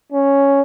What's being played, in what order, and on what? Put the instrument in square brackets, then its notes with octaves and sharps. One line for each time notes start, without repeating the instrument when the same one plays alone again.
[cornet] C#4